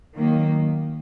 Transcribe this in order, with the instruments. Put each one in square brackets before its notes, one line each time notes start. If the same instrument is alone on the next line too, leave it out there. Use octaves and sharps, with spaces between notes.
[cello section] D#3 F#3 A#3